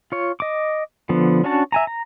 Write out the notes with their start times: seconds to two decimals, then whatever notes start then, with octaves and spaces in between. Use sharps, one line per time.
0.12 F4 C#5
0.40 D#5 D6
1.09 D3 F3 B3
1.44 C#4 D4 F#4 C#5 A5
1.72 E5 G#5 A#5
1.87 A#5